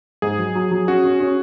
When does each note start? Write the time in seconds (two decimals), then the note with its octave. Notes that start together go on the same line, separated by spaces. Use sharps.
0.22 G#2 G#4
0.38 F#3
0.55 F#3
0.71 F#3
0.87 C#4 F#4
1.04 C#4
1.20 C#4